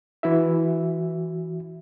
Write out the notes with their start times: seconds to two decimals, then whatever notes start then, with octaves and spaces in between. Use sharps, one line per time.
0.23 E3 E4 F#4 E5